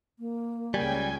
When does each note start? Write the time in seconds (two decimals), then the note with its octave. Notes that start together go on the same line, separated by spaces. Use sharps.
0.19 A#3
0.74 C#2 C#3 G3 G5 G#5